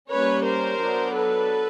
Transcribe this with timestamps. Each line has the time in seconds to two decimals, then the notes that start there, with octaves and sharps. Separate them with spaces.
0.11 G3 A#3 C#4 B4 C#5
0.46 A#4 C5
0.80 F#3 B3 D4
1.15 A4 B4